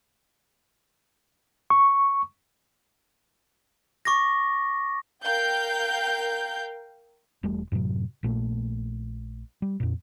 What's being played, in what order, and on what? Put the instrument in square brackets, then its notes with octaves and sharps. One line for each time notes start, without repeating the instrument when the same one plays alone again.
[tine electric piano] C#6
[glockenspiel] C#6 D6 A6 A#6
[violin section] A#4 F5 G5 G6
[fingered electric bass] E1 G3 A3
F#2 A2 C3 F#3
A#1 A#2 A3
G3
F2 A#2